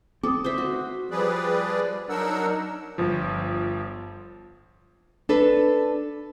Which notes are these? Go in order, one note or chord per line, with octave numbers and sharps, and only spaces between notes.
C4 A4 D6 D#6
C5 E5
F#4
F3 G3 G#4 B4 D5
F#3 D4 D#4 A#4 F#5 E6
G1 F3
D4 A4 B4